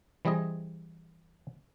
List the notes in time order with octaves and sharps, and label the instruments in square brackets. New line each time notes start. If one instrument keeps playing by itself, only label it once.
[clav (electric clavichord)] E3 G3 C4 G#4 D#5